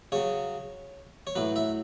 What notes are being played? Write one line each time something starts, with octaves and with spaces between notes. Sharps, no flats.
C#3 F#3 C#5
C#5
A2 F#3 B4
E5